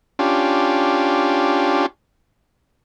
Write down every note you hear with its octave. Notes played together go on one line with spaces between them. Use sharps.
C#4 D4 F4 G4